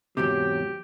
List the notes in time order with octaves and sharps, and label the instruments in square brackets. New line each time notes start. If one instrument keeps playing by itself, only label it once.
[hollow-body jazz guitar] E2 G#2 C3 [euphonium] F#3 [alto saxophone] G4